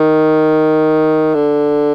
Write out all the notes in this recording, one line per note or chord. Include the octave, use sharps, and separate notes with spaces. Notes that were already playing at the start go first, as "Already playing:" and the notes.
Already playing: D#3
D3